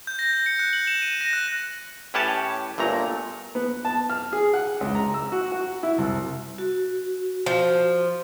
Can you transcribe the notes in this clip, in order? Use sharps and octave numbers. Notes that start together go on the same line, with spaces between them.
G6
A#6
A#6
C#7
F#6
F#7
E7
D#7
A#6
F#6
A2 C#4 G4 B4 C#5 A5
G1 A#2 A3 A#5
B3
A5
F6
G#4
F#5
C#2
A#5
E6
F#4
F#4
E4
C2
F#4
F3